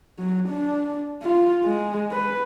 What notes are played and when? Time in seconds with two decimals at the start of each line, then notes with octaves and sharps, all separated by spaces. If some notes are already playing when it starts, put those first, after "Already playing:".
0.19 F#3
0.48 D4
1.22 F4
1.64 G#3
2.12 B4